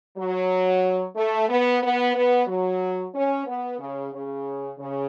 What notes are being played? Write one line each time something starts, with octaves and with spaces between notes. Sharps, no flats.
F#3
A3
B3
B3
B3
F#3
C#4
B3
C#3
C#3
C#3